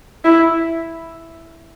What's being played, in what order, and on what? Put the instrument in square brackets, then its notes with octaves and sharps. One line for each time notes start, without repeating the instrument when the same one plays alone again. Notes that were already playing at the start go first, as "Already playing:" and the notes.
[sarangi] E4